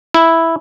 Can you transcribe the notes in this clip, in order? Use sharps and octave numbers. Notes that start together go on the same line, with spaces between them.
E4